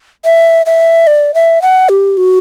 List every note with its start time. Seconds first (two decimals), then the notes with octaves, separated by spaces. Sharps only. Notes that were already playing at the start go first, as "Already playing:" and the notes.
0.25 E5
0.66 E5
1.07 D5
1.34 E5
1.62 F#5
1.89 G4
2.17 F#4